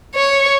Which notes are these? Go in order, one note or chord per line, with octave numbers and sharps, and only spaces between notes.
C#5